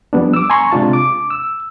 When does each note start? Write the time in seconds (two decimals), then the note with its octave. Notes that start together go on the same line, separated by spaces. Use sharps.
0.13 F3 G3 B3 D4
0.33 D6 E6
0.50 G#5 A#5 C6 C#6
0.72 C3 G#3 D4 F4 A5
0.93 D6
1.30 E6